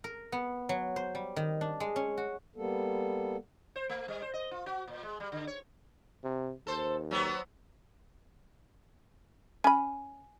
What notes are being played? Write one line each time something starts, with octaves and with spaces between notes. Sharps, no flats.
A#4
B3
F#3
C5
G3
D#3
D4
G#3
C#4
F#4
G3 A#3 B3 A4
C5
A3
G3
C5
D#5
F4
F#4
A#2
G#3
G3
D3
C#5
C3
D#2 A4 C5
F#3 B3 C4
C#4 G#5 B5